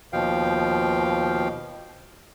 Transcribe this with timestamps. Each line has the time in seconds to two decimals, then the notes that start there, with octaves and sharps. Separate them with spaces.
0.13 D#2 B2 F3 F5 G5